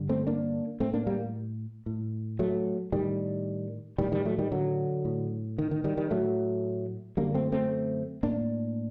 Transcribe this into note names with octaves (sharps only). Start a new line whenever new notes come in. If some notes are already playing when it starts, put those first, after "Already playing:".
Already playing: G2 D3
A3 C4
A#3 D4
A2 A3 C4
A#3 D4
G3 A#3
A2
F#3 A3
A2 D#3 G3
A2 D#3 G3
D#3 G3
F#3 A3
D#3 G3
D3 F#3
A2
D#3
D#3
D#3 G3
D#3 G3
A2 F#3 A3
F#2 D3 G3 A#3
A3 C4
A3 C4
A2 A#3 D4